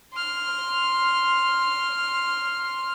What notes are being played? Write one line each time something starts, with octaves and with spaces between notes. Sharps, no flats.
C6 F6